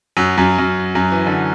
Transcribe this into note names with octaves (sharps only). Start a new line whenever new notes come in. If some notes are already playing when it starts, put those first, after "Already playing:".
F#2 F#3
F#2 F#3
F#2 F#3
F#2 F#3
E3
D3